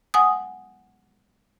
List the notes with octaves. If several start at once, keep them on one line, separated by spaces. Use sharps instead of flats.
F#5 G#5 D#6